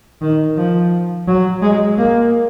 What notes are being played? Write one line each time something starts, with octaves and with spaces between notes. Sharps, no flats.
D#3
F3
F#3
G#3
A#3